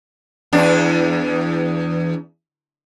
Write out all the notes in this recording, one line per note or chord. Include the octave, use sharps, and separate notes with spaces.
E2 D4